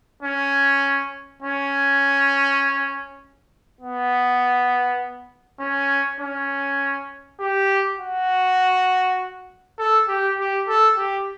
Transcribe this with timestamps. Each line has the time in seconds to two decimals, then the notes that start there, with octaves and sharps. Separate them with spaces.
0.23 C#4
1.43 C#4
3.81 B3
5.60 C#4
6.20 C#4
7.40 G4
8.00 F#4
9.78 A4
10.08 G4
10.39 G4
10.68 A4
10.98 G4